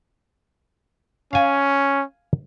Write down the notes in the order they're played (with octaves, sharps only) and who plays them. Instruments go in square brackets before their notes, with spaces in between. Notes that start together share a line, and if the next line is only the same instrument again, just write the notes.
[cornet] C#4 [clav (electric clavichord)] F5 G#5